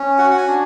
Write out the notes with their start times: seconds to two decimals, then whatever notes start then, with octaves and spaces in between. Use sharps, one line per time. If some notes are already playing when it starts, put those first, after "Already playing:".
Already playing: C#4
0.18 F#4 F#5
0.31 F#5
0.37 G#5
0.47 D4